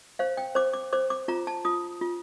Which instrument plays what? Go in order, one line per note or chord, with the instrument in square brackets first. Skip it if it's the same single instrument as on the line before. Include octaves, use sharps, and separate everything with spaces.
[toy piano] C5 F5
G5
C5 D6
D6
C5 D6
D6
F4 A#5
A5
F4 D#6
F4